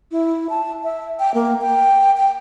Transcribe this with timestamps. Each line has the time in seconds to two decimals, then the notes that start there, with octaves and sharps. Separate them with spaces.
0.12 E4
0.50 A5
0.84 E5
1.19 G5
1.34 A#3
1.61 G5
2.17 G5